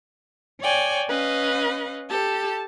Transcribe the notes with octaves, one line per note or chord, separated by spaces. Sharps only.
C#5 D5 G5 G#5
C#4 B4 D#5 F5
G4 A4 A5